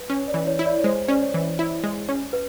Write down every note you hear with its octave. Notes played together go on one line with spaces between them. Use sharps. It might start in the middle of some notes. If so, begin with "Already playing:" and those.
Already playing: B4
C#4 C#5
D5
E3
C#5
E4
D5
C#5
G#3 C5
C#4 D5
C#5
E3
E4
G#3
C#4
B4